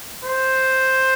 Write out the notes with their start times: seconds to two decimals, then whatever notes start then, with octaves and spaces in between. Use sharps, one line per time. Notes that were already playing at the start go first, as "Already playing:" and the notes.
0.25 C5